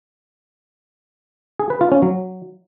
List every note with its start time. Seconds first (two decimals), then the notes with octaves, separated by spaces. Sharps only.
1.59 G#4
1.70 B4
1.81 F4
1.92 C#4
2.02 F#3